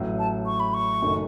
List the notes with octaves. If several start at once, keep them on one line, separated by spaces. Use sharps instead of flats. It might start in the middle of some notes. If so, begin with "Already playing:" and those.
Already playing: A1 A2 F#3
A5
C#6
B5
C#6
F#1 F#2 D#3 A3